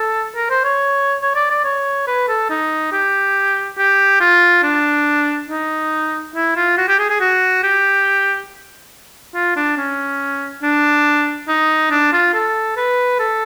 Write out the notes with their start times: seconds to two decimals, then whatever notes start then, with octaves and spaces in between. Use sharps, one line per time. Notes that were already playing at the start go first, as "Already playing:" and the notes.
Already playing: A4
0.36 A#4
0.50 C5
0.65 C#5
1.22 C#5
1.36 D5
1.51 D5
1.64 C#5
2.07 B4
2.28 A4
2.50 D#4
2.92 G4
3.78 G4
4.21 F4
4.63 D4
5.49 D#4
6.35 E4
6.56 F4
6.78 F#4
6.89 G4
6.99 G#4
7.10 G#4
7.21 F#4
7.64 G4
9.35 F4
9.56 D4
9.77 C#4
10.63 D4
11.48 D#4
11.91 D4
12.13 F4
12.34 A4
12.77 B4
13.20 A4